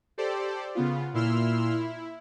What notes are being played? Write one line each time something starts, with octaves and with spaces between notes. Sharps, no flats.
G4 A4 C5 D5
C#3 B3 F4
A#2 E4 C6 E6 F6
E4